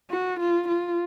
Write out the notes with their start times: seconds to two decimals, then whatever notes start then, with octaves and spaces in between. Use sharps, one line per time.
0.11 F#4
0.40 F4
0.68 F4